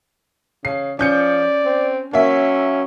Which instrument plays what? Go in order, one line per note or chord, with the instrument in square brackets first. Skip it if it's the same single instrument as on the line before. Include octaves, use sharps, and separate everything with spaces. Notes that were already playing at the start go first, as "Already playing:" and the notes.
[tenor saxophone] C#3 [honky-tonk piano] C7
[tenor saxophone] F3 [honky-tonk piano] C#4 G6 C#7 [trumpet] D5
[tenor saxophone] C4
[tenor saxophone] F#3 [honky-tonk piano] A#3 E5 [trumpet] C#4